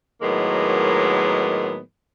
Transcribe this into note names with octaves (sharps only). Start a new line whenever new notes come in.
A2 D#3 F#3 G#3 A#3 B3